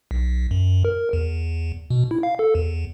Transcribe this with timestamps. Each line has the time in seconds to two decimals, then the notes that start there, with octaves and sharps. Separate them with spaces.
0.11 B1
0.51 F#2
0.85 A#4
1.13 E2
1.90 B2
2.11 E4
2.23 F5
2.39 A4
2.55 E2